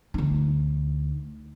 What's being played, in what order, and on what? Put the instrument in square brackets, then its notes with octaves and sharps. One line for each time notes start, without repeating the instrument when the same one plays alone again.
[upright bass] D2 D#4